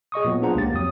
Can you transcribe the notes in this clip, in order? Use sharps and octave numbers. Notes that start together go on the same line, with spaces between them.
G#4 D#5 C#6 D#6
A#2 F#3 B3
D4 F4 G#4 C5 F#5 A#5
C#2 A#3 G4 A6
F2 F#3 D#6